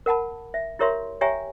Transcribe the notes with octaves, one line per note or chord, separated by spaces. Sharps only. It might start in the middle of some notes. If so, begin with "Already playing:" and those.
A#4 F#5 A5 B5
E5
E4 G4 A#4 C#5 E5 C6
G4 C#5 E5 G5 G#5 A#5